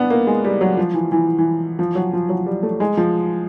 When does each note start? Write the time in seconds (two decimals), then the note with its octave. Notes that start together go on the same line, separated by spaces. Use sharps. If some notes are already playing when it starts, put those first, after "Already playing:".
Already playing: B3 D4
0.10 A#3
0.27 G#3
0.44 G3
0.61 F#3
0.77 F3
0.94 E3
1.12 E3
1.39 E3
1.79 F3
1.95 F#3
2.13 F3
2.29 F#3
2.46 G3
2.63 A3
2.80 G#3
2.97 F3